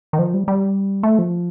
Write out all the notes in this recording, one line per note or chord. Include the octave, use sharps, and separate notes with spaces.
D#3
F3
G3
G3
A3
F3